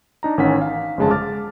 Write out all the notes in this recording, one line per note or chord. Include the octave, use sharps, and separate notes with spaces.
D4 D#4 A#5
A1 D#3 C#4 F#5 B6
F5
G1 F2 C#3 G#3 G#4 A5
D6 F6 A6